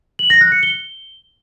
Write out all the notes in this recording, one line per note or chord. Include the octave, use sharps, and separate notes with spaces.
F#7
A#6
F#6
C#7
G7